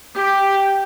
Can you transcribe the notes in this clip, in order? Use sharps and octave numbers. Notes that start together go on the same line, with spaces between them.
G4